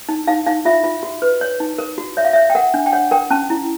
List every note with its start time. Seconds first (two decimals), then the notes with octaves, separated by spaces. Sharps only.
0.09 D#4
0.27 D#4 F5
0.46 D#4 F5
0.65 F4 E5
0.84 F4
1.03 F#4
1.22 B4
1.41 C#5
1.60 D#4
1.78 A#4
1.98 F#4
2.17 C#5 E5
2.25 F5
2.33 C#5 E5
2.50 G5
2.55 A#4 F#5
2.74 D4
2.86 G5
2.92 C#5 F#5
3.11 A#4 G5
3.30 C#4 A5
3.50 E4